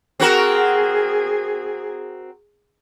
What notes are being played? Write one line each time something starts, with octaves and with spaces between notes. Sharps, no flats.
C4 F#4 G#4 A#4